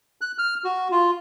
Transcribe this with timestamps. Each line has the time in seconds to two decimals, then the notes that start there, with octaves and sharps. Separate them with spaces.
0.21 F#6
0.38 F6
0.64 F#4
0.91 F4